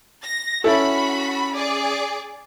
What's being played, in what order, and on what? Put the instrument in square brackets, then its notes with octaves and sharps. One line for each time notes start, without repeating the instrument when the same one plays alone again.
[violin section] A#6
[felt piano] C#4 E4 A4 [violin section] F#4 B5
[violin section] G#4 D5